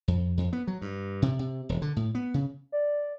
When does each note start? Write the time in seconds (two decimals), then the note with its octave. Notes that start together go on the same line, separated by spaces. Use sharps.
0.08 F2
0.37 F2
0.53 B3
0.67 F#3
0.82 G2
1.22 C3
1.39 C3
1.69 E1
1.82 D3
1.96 A2
2.15 B3
2.34 C#3
2.72 D5